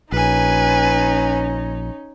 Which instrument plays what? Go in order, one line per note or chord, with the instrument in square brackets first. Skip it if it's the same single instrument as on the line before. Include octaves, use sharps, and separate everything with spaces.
[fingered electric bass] A#1 [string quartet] C#4 D#4 [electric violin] B4 G#5